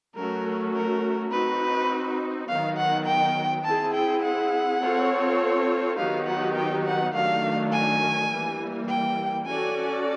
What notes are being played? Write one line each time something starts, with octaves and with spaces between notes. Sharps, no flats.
F#3 A3 C#4 F#4 A#4
A#4
C4 D#4 F#4 B4
D#3 F#3 B3 F5
F#5
G5
C4 E4 G#4 A5
G5
F#5
C4 F4 A4 C#5
D#3 F#3 B3 D#4 G4 F5
F#5
G5
F#5
D#3 F#3 A3 D4 F5
G#5
E3 G3 A#3
G5
C#4 F#4 A4 D5 G#5